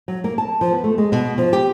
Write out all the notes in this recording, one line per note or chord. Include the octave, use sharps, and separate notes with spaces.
F#3
A#3
A5
F3
B3
A3
G#3
B2
F3
G4